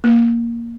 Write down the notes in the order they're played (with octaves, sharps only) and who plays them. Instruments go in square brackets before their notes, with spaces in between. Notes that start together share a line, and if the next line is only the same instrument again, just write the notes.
[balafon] A#3